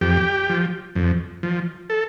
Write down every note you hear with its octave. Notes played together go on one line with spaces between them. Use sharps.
F2 G4
F3
F2
F3
A4